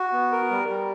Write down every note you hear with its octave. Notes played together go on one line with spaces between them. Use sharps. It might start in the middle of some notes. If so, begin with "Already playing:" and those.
Already playing: F#4
B3
A#4
G3
G3